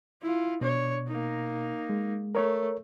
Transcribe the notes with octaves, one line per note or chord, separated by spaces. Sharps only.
E4 F4
B2 D4 C#5
A#3 D#4
G#3
A3 A#4 C#5